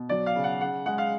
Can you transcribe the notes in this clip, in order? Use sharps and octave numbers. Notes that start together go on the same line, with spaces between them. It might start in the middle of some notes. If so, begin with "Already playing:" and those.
Already playing: B2
F#3 D5
F5
C#3
F#5
C#3 F#5
G#3 F#5
F5